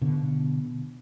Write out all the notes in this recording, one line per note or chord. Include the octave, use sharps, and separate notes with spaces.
B2 D3